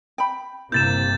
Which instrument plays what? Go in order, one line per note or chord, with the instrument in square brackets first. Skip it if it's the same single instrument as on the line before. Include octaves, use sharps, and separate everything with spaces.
[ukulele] G5 B5
[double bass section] G1 C3 A#3 [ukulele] E4 [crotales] G6 A6 E7